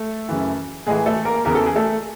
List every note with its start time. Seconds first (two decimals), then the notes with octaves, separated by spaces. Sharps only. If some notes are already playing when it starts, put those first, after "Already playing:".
Already playing: A3 A4
0.29 F#2 C#3 E3
0.87 A2 E3 G#3 G#4
1.06 A3 A4
1.25 A#3 A#4
1.45 E2 C#3 E3 A#4
1.55 A4
1.66 G#4
1.76 A3 A4